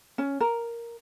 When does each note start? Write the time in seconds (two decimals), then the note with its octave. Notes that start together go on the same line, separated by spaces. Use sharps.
0.18 C#4
0.41 A#4